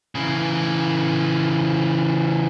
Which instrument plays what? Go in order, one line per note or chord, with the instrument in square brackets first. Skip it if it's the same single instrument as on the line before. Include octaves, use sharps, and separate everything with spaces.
[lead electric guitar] C#3 E3